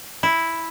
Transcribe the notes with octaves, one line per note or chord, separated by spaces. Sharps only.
E4